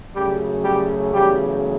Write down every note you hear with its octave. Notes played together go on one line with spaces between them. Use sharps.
F#2 C#3 F#3 G3 A3 G4
G3 G4
E2 C#3 F#3 G3 A3 G4